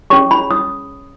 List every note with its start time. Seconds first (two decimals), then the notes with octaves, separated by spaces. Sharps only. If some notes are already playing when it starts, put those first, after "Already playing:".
0.10 C#4 G#4 C#5 C#6
0.31 B5
0.51 D#6